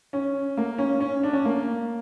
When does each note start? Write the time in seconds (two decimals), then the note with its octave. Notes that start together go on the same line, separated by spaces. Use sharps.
0.13 C#4
0.57 A#3
0.78 C#4
1.01 C#4
1.23 D4
1.33 C#4
1.45 A#3